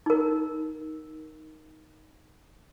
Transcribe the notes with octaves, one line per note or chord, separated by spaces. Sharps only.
D#4 A#4